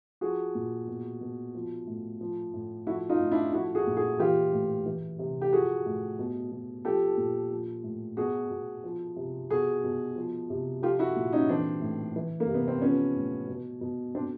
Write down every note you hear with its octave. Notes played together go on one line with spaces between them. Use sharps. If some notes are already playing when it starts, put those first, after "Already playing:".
F3 F#4 G#4
A#2
B2
B2
F3
A2
F3
A2
F3 E4 F#4
D#4 F4
A2
D4 E4
F3 E4 F#4
F#4 G#4
A#2
F#4 G#4
E3 F4 G4
A2
E3
C3
G4
F3 F#4 G#4
A2
B2
B2
F3 G4 A4
A#2
F3
A2
B2 F#4 G#4
B2
F3
C3
B2 F#4 G#4
B2
F3
C3
F3 F4 G4
E4 F#4
A#2
C#4 D#4
E3 C4 D4
A2
E3
A#3
C3
B3
C4
F3 B3 C#4
A2
B2
B2
B2 C4 D4